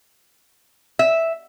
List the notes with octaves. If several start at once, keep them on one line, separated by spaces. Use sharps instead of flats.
E5